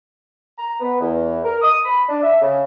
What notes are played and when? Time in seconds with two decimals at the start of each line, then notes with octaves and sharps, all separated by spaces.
0.57 A#5
0.80 B3
1.00 E2
1.44 A#4
1.62 D#6
1.85 B5
2.09 D4
2.23 E5
2.41 C#3